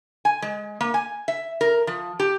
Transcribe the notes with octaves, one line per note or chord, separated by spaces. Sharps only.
G#5
G#3
A#3
G#5
E5
A#4
F3
G4